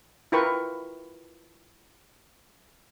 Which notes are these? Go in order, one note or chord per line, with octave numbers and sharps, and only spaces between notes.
E4 F4 A#4 B4 G5 C#6